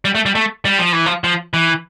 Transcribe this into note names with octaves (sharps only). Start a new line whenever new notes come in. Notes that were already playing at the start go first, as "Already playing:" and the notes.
G3
A3
G3
A3
G3
F3
E3
F3
F3
E3